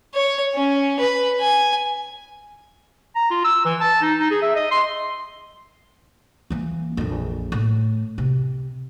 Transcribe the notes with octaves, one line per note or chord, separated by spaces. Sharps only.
C#5
C#4
B4
G#5
A#5
F4
E6
E3
A5
D#4
D#4
G#4
E5
D#5
C6
E3 A#3
A#1 F2
A2
C3